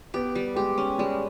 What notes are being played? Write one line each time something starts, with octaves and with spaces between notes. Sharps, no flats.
B3 G4
G3
G#3 G4
C#4
G3 G#3